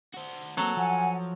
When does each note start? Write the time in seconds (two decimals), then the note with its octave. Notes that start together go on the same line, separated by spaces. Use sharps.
0.14 F#4 C5
0.57 F#3 A#3 C4 A4
0.77 F3 F#5 G#5